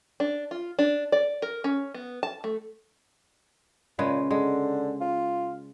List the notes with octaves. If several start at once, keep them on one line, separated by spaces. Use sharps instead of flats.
D4
F4
D4
D5
A#4
C#4
B3
A5
A3
A#2 C#3 G#3 B4
D3 G#3
F4